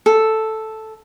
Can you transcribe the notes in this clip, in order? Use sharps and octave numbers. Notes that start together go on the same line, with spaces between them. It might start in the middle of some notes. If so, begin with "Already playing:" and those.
A4